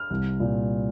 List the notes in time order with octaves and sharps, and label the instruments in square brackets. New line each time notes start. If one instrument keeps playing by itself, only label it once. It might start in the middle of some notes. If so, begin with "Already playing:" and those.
Already playing: [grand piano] F6
C2
A#2